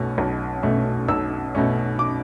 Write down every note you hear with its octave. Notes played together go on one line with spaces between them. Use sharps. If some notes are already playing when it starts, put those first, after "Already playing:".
Already playing: B1 B2 A3 C#4
B1
B2 A3 C#4
B1 E6
B2 A3 C#4
D6